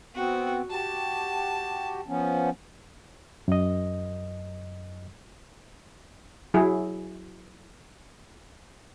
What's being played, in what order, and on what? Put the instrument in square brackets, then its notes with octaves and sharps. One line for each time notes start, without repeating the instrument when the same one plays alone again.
[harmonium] B3 C4 [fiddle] F#4
[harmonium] F#4 G4 [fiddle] A5
[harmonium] F3 B3 C#4
[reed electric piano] F#2 D#5
[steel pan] F#3 E4 G#4